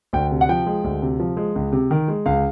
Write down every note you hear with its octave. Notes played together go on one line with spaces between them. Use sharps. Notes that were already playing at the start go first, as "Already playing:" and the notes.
D2 G5
C3
F#5
F3 G5
G#3
D2
C3
F3
G#3
C#2
C3
D#3
G#3
C#2 F5